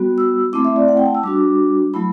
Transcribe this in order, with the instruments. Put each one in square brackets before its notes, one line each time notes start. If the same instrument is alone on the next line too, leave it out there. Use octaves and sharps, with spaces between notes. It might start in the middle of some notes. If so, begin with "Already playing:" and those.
Already playing: [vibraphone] G3 B3 F#4
E6
A3 C4 E4 D6
E5
D5
F#5
G5
A5
E6
G3 D4 F#4 D6
F#3 A3 E4 B5